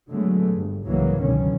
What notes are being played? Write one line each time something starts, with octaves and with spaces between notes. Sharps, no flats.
D3 F#3 G#3 A3 B3
G1 G2
C2 G#2 C#3 E3 F#3 A#3
C#2 F#2 B2 D3 D#3 C#4